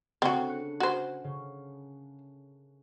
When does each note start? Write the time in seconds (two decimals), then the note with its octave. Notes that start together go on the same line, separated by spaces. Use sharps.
0.22 C#3 A3 C4 D4 F#4
0.49 F#6 C#7
0.80 F#4 A#4 C5 G#5
1.24 C#3